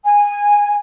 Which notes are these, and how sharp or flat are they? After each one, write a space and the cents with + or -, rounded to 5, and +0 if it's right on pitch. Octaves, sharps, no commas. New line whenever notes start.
G#5 -15